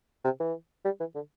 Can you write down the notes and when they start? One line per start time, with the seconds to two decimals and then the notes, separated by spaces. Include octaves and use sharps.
0.25 C3
0.40 E3
0.85 G3
1.00 E3
1.15 D3